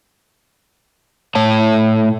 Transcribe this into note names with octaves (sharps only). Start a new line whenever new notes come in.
A2 C#5 A5